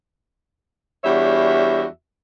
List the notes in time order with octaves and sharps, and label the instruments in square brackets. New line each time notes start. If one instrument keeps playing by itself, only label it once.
[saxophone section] E2 G3 D4 F#4 C#5 E5